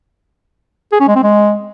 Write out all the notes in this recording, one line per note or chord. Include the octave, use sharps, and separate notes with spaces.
G#4
C#4
G#3
C4
G#3